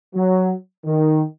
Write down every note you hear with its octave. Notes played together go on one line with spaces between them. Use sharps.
F#3
D#3